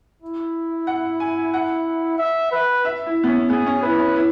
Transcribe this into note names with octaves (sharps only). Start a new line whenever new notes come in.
E4
F#5
G#5
F#5
E5
B4
E5
E4
B3
C#4
B3 G#4
C#4
E4 B4
C#4
E4